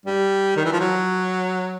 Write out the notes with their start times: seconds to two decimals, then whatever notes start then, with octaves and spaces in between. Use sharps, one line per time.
0.06 G3
0.56 D#3
0.65 E3
0.72 F3
0.80 F#3